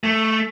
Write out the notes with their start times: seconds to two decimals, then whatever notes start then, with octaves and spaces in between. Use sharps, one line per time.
0.04 A3